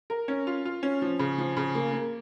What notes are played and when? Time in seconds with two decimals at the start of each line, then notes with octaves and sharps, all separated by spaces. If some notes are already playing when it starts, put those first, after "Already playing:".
0.10 A#4
0.28 C#4
0.47 F4
0.65 F4
0.83 C#4
1.02 F3
1.19 C#3
1.38 F3
1.57 C#3
1.75 A#3
1.93 A#3